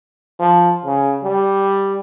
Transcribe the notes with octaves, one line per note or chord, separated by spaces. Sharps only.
F3
C#3
G3